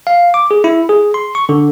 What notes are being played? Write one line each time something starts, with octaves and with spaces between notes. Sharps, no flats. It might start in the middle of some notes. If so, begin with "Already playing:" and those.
F5
D6
G#4
E4
G#4
C6
C#6
D3